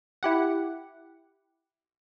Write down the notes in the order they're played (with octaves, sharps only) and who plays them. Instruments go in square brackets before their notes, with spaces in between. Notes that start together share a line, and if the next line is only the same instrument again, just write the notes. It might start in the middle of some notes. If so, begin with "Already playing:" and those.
[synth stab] E4 G4 F#5